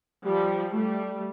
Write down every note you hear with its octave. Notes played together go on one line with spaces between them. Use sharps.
F3 G3
G3 A3